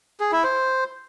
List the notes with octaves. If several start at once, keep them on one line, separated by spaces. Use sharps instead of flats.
G#4
E4
C5